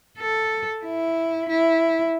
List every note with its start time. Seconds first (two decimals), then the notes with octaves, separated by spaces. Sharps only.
0.19 A4
0.84 E4
1.49 E4